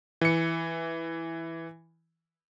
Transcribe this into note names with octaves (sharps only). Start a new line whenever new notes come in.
E3 C#7